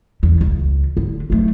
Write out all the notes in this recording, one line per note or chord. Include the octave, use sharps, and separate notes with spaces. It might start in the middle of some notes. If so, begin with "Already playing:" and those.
E2
C#2
D3
F#3 A3